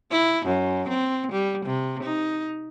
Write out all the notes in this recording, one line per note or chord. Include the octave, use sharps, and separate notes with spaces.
E4
F#2
C4
G3
C3
D#4